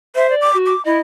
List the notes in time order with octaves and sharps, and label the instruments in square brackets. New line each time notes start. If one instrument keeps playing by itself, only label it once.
[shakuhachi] C5 [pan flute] E5
[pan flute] D5
[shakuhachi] D6
[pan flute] F#4
[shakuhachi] D6
[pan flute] E4 [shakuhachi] D#5